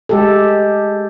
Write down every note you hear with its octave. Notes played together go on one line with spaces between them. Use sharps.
G#3 G4 A4